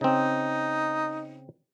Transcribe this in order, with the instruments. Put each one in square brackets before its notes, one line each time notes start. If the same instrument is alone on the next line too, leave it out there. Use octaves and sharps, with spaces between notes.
[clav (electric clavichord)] C#3 C4 [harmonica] D#4